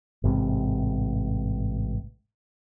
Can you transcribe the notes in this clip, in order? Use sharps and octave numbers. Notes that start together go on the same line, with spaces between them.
A1 G#2 C3